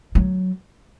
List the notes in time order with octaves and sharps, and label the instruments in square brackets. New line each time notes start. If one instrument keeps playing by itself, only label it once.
[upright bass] F#3